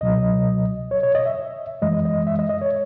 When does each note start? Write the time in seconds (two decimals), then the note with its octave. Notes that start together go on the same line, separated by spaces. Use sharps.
0.01 C#2 B2 F#3 D#5
0.91 C#5
1.03 C#5
1.15 D#5
1.25 E5
1.82 F#2 E3 G#3 D#5
2.05 D#5
2.27 E5
2.39 D#5
2.49 D#5
2.61 C#5